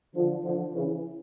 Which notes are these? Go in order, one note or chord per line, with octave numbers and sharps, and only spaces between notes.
D3 F3
D3 F3
C#3 E3